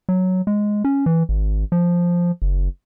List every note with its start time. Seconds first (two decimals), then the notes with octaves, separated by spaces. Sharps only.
0.09 F#3
0.47 G#3
0.84 C#4
1.06 E3
1.29 G#1
1.72 F3
2.42 F#1